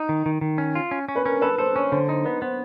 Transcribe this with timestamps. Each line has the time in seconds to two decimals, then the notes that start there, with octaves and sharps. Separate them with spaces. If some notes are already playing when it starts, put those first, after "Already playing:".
Already playing: D#4
0.09 D#3
0.26 D#3
0.41 D#3
0.58 C#4
0.75 F4
0.91 C#4
1.09 C#4
1.16 B4
1.25 C#4 A#4
1.42 A4 B4
1.58 A4 C5
1.76 C#4 C#5
1.92 D3 C5
2.08 D#4 C5
2.25 B3 B4
2.42 B3 C5